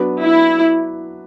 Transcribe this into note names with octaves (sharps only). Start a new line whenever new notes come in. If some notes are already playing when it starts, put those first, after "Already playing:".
Already playing: F#3 B3 D4 F#4 B4
E4